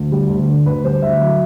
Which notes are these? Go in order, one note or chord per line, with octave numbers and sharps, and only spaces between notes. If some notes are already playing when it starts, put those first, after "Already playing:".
Already playing: D2
G3
D2
D3
D2 B4
G3 C5
D2 E5
F#3